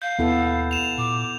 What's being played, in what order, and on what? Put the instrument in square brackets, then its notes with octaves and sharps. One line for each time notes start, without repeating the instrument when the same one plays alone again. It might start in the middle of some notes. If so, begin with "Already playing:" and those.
[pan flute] F5 [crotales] G6
[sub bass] D#2 [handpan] B3 E4 A4
[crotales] E7 F7
[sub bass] A#2 [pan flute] D6